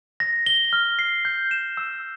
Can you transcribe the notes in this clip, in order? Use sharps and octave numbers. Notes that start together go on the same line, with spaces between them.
A#6
G7
F6
C7
G6
E7
E6